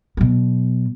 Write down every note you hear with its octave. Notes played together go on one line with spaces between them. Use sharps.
B2 F#3